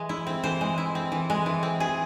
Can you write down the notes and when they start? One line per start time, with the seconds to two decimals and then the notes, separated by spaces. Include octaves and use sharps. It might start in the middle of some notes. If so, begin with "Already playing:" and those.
Already playing: E3 G#3
0.09 E4
0.27 C4
0.44 E3 C5
0.61 G#3
0.78 E4
0.95 C4
1.12 E3
1.30 G#3
1.46 E3
1.63 C4
1.80 E3 G#4